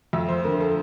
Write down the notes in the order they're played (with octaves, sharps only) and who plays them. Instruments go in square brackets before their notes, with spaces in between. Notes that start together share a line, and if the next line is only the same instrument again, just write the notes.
[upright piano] F2 E5
C5
D3 A#4
A4